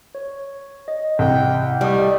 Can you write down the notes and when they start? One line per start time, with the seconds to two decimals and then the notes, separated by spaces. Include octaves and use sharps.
0.15 C#5
0.88 D#5
1.19 C2 G5
1.81 G3 A3 D#5 D#6